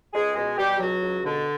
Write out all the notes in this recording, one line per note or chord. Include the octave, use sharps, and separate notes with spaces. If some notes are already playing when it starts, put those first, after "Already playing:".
C#2 G#3 G#4
B2 G#3 G#4
B2 G3 G4
C#2 F#3 F#4
C#2
B2 D3 D4